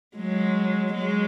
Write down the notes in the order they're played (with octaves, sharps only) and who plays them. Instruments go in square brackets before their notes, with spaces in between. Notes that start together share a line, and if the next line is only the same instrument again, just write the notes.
[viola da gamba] F#3 G#3
F#3 G#3